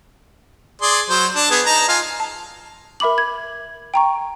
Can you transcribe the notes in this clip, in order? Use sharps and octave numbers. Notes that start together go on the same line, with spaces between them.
G#4 D5 C6
F#3 C5
D4 A5
B3 G#4
D#4 A5 A#5
F4 F5 G#5
A5
A#4 E5 B5 D6 F#7
G#6
G5 A#5 C#6